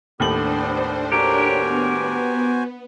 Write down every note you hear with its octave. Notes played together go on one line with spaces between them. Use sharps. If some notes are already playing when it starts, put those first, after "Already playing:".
D#2 A2 B3 D4 G4 C5 F#7
D4 F#4 G4 A#4 C5 C#5 G#5
B3